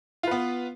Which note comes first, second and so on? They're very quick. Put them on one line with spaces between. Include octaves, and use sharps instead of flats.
F4 B4 B3